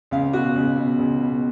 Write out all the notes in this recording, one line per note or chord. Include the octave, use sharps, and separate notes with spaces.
C#2 F5
B2 F#4
C#2
B2
C#2
B2